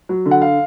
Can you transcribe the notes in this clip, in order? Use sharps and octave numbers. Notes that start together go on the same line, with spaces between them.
F#3
D3
F#5
F5